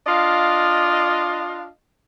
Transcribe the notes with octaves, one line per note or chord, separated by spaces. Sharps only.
D4 F4 D#5 F5